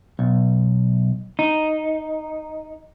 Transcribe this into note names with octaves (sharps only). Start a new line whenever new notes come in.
B1
D#4